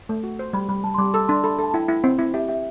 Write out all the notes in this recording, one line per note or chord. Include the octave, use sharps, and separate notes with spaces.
A3
F#4
C5
G3 B5
G3 B5
G3 A5
C6
G3 D6
A4 E6
D4 C6
A4 B5
A4
A5
E4 G5
E4
C4
E4
G4 E5
G4 E5